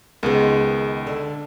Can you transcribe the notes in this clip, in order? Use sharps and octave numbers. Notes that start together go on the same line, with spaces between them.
C#2 D#3 G#3 B3
D3